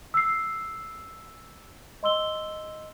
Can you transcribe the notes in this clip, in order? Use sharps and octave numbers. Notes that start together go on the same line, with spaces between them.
E6 C7
D#5 C6 E6 G7